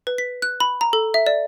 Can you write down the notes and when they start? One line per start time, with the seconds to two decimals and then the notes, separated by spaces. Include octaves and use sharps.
0.07 B4
0.18 B6
0.42 F#6
0.60 B5
0.81 A#5
0.93 A4
1.14 E5
1.26 D5